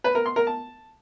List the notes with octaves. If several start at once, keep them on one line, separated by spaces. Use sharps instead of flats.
B4
A#4
C6
A#4
A5